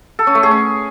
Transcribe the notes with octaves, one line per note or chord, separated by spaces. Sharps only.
A4
C#4
A3
G#4
C#4